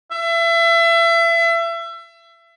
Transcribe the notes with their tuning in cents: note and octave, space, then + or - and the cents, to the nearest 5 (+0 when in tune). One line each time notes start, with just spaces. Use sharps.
E5 +30